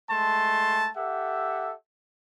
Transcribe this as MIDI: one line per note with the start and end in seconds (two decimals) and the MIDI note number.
0.10 0.89 56
0.10 0.89 57
0.10 0.89 81
0.10 0.89 84
0.96 1.74 67
0.96 1.74 69
0.96 1.74 76
0.96 1.74 78